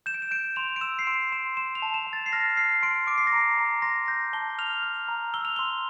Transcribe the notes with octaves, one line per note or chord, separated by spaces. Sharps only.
G6 E7
D7
E7
G6 D7
C6 F7
D7
E6 E7
C7
C6 D7
C6 E7
C6 E7
F7
A5
E7
A5
A6
C7
F6 A#6
F6 C7
C6 D7
D6 D7
C7
A#6
A#5 C7
A#5
C6 A#6
G6 A#6
A5 G7
F6 F7
F6
A#5
E6 G7
F7
C6 G7